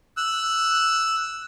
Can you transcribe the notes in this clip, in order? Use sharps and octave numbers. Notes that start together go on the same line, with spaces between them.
E6 F#6